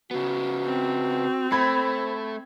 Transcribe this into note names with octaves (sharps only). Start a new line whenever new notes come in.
C#3 B3 F#4
C4
A3 C5 B5 G#6